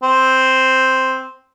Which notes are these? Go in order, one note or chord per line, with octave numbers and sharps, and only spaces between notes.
C4